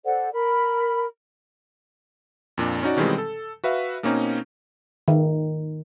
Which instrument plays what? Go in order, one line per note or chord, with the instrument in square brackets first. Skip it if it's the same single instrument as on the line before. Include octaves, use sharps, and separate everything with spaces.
[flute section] A4 C5 D5 F#5
A#4 B5
[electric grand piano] F2 A#2 D4
C#4 D#4 F#4 D5
B2 D#3 E3 G3 G#3 C4
A4
F#4 B4 E5 F5
B2 A#3 C4 C#4 D#4
[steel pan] D#3